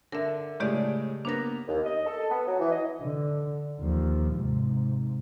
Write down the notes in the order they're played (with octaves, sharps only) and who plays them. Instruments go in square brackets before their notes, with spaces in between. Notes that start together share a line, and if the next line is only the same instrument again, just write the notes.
[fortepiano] D3 [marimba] A#4 E5
[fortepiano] A2 G#3 [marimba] C#3 G4 D5
[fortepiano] A#3 B3 [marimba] D4 A#6
[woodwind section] D#2
D#5
A4
B3
F#3
E3
D#5
[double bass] D3
D#2 F3
G#2 C3